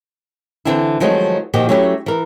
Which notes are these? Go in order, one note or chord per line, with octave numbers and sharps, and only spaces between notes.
D3 E3 C4 D4 E4
D#3 F3 F#3 G#3 A3 C4
A#2 D#3 F3 F#4 G4
F#3 A3 C#4 E4 G4
E3 A#4